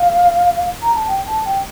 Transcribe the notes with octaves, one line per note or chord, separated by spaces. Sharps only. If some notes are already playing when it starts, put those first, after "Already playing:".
Already playing: F5
A#5
A5
G5
A5
G5